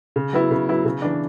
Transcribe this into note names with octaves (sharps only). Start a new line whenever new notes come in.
C#3
F#3 B3 E4
C#3
F#3 B3 E4
C#3
E3 B3 D4